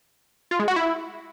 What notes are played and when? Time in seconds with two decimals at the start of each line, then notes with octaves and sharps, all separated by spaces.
0.51 F4
0.60 G#3
0.68 F#4
0.76 E4